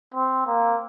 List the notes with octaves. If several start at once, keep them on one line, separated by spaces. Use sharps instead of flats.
C4
A#3